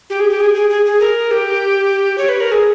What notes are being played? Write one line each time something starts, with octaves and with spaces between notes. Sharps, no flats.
G4
G#4
G4
G#4
G#4
G#4
G#4
A#4
G4
C#5
B4
A#4
G#4